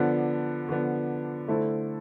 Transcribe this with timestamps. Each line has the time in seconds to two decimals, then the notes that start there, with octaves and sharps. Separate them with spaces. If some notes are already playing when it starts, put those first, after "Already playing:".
Already playing: D3 F3 B3 D4
0.69 D3 F3 B3 D4
1.48 D3 A3 E4 A4 C5